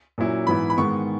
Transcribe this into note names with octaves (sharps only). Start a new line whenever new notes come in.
A#2 F#3 C#4 E4
G#2 E3 B3 E4 B5
B5
G#2 D#3 G#3 B3 C#6